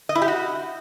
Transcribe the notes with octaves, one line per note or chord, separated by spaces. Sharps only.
D#5
E4
G4
F#4